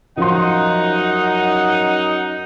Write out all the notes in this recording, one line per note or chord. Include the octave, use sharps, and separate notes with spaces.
F#2 F3 D#4 F#5 C6